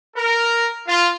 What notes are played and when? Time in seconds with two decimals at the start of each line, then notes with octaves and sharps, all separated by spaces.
0.17 A#4
0.87 F4